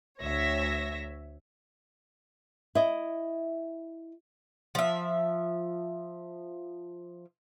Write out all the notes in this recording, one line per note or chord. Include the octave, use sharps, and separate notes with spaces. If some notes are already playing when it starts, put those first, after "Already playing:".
D2 C#5 E5 A#6
E4 D#5
F3 E5